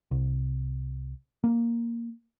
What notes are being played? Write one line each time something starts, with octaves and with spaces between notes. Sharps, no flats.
C2
A#3